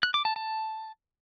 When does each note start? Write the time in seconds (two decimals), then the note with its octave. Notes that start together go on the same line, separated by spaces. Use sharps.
0.03 F#6
0.14 D6
0.25 A5
0.36 A5